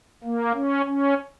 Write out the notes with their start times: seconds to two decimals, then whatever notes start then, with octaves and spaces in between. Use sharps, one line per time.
0.24 A#3
0.54 C#4
0.86 C#4